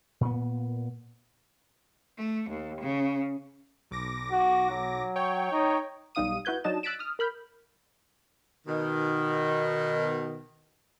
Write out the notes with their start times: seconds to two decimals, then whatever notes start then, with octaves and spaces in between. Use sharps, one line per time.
0.21 A#2 B3
2.18 A3
2.49 D#2
2.82 C#3
3.91 B1 D6 A#6
4.32 F#4
4.70 F#3
5.16 C#5 G5
5.52 D#4
6.15 B1 G3 D#4 F5 D#6 D#7
6.45 E4 F#4 B4 G6 G#6
6.64 F#3 D4 D#4 D#5 A5 E7
6.83 E6 F#6 A6 B6 D7 E7
6.99 D#6 F6
7.19 A#4 B5 F6 G6
8.67 B2 D#3